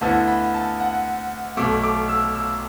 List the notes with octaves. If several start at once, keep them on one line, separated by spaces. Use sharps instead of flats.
D2 D3 B3 E4 A5
B5
A5
F#5
B1 B2 A3 D6
D6
E6
E6